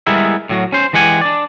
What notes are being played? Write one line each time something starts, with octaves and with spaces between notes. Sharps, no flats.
G3 G#3 B3 E4 A#4 E5
A2 F#3 F#4
C#4 C5
E3 G#3 G4 F#5 G#5
D4 D5